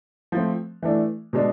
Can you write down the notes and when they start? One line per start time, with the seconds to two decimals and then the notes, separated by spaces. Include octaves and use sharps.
0.32 F3 A3 C4
0.82 E3 A3 D4
1.33 B2 G#3 D4